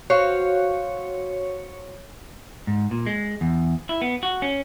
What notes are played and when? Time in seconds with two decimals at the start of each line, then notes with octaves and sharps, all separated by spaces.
0.10 F#4 C5 C#5 F5
2.67 G#2
2.91 A#2
3.06 G#3
3.41 E2
3.89 E4
4.02 B3
4.23 F#4
4.42 C#4